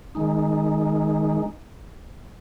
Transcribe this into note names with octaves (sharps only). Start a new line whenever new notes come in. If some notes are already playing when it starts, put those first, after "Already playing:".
D#3 G#3 D#4